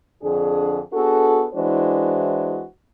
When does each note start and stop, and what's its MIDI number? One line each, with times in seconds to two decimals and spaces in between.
0.23 0.80 41
0.23 0.80 50
0.23 0.80 62
0.23 0.80 68
0.93 1.45 59
0.93 1.45 62
0.93 1.45 66
0.93 1.45 68
0.93 1.45 69
1.54 2.62 52
1.54 2.62 56
1.54 2.62 62
1.54 2.62 64
1.54 2.62 66
1.54 2.62 72